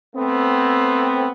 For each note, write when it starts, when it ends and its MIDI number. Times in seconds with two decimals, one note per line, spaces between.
0.16 1.28 57
0.16 1.28 59
0.16 1.28 60